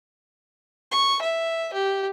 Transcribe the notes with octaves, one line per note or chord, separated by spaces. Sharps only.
C#6
E5
G4